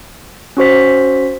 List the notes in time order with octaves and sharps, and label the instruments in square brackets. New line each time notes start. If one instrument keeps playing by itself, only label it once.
[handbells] C#4 F#4 C5 B6